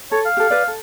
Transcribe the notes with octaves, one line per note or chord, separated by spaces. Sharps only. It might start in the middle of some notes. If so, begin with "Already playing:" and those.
A4 C#5
F5
G4 A4
B4 D5
A4